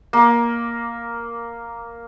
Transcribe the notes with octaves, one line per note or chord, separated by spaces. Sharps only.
A#3